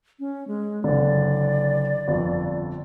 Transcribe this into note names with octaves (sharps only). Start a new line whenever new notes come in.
C#4
G#3
F#1 D3 D5
G1 F2